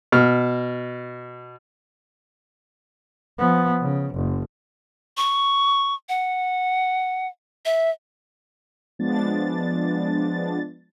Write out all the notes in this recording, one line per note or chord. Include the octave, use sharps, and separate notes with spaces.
B2 F6
F3 B3
C#3
F#1
C#6
F#5
E5
F3 G#3 B3 D4 A6